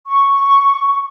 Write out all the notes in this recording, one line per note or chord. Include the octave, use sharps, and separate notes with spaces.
C#6